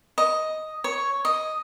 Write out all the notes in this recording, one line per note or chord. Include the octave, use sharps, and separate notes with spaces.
D#5
C#5
D#5